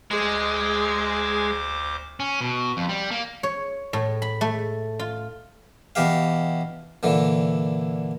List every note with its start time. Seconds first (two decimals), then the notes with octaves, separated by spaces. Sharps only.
0.11 D2 G#3 G#4 C5 D6 G#6
2.20 C#4
2.41 B2
2.77 F2
2.89 G3
3.11 A#3
3.43 C#5
3.93 A2
4.22 B5
4.41 A3
4.99 F4
5.95 B2 E3 G4 F5
7.03 A#2 D3 E3